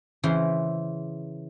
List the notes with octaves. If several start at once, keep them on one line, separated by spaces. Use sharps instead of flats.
C#3 E3 C5